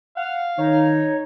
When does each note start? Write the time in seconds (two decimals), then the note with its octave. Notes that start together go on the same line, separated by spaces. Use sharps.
0.17 F5 F#5
0.58 D#3 D#4 C#5